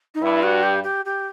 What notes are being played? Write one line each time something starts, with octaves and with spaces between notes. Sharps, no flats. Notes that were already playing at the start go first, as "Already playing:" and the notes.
D#4
G2 E4
F#4
G4
G4
G4